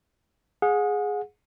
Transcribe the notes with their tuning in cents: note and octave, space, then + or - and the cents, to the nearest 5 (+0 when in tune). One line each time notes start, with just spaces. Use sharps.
G#4 +0 F#5 -35